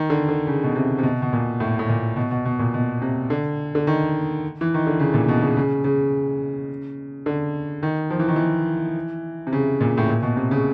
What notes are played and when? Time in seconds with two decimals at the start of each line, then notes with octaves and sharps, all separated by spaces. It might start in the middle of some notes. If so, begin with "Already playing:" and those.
Already playing: D#3
0.10 D3
0.28 D3
0.47 C#3
0.63 B2
0.76 C3
0.99 C3
1.03 B2
1.22 B2
1.33 A#2
1.60 A2
1.79 A2
1.89 A#2
2.16 B2
2.31 B2
2.45 B2
2.59 A#2
2.74 B2
3.02 C3
3.30 D3
3.75 D3
3.87 D#3
4.61 E3
4.74 D#3
4.87 D3
5.00 C#3
5.14 A#2
5.28 B2
5.42 C#3
5.57 C#3
5.84 C#3
7.26 D3
7.83 D#3
8.10 F3
8.20 E3
8.28 D#3
8.36 E3
9.47 C3
9.53 C#3
9.81 A#2
9.98 A2
10.09 A#2
10.22 B2
10.37 C3
10.51 C#3